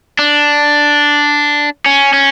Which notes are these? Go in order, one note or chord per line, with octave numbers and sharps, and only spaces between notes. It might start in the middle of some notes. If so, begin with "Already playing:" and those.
D4
C#4
C#4